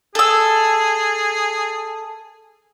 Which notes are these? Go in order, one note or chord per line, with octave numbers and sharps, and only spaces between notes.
G#4 A4 E6